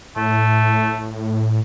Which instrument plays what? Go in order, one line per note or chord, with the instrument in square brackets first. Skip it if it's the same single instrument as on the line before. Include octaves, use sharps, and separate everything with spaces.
[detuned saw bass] A2 [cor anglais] A3